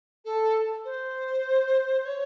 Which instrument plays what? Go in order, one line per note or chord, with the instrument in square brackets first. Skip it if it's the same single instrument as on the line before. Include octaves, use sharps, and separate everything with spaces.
[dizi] A4
C5
C#5